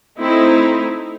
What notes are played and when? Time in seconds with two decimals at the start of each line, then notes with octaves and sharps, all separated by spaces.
0.19 A3 C4 D#4 E4